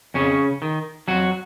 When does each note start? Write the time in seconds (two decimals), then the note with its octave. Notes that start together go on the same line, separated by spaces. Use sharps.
0.14 F2 C#3 C#4
0.62 D#3
1.08 F2 F#3 F#4